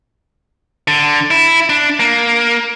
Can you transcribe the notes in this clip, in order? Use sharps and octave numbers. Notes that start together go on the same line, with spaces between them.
D3
E4
D4
A#3